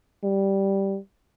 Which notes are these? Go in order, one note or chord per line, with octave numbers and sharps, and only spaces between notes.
G3